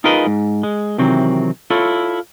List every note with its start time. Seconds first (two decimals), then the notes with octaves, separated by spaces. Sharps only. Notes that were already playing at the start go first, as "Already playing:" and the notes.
0.04 D#4 F4 G#4 A#4 B4 D#5
0.27 G#2
0.63 G#3
0.98 C3 D#3 E3 F#3 C4
1.70 E4 F4 A4 C#5